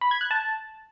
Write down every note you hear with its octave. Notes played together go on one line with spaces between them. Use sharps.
B5
G#6
F#6
A5